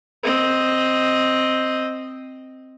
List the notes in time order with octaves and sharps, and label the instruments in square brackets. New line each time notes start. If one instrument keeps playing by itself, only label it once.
[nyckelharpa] C4 D#5